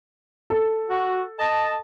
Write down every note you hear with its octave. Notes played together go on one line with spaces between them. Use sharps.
A4
F#4
D#5 A5